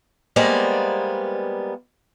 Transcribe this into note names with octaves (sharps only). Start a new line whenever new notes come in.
G3 G#3 A#3 B3 C5 D5